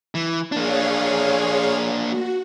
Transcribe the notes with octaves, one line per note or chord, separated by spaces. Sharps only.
E3
A#3 D4 G#4 C#5 F5
F#4